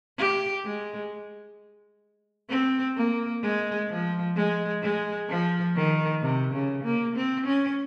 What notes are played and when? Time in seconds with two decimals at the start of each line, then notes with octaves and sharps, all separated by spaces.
0.18 G4
0.65 G#3
2.50 C4
2.97 A#3
3.42 G#3
3.90 F3
4.36 G#3
4.82 G#3
5.29 F3
5.76 D#3
6.22 C3
6.53 C#3
6.84 A#3
7.16 C4
7.46 C#4